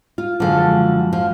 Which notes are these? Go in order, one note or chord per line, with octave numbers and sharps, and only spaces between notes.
F4
F#1 D3 F3 G#3
A4
F3